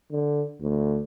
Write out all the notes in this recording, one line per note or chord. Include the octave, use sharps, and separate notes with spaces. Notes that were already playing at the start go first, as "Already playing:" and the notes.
D3
D2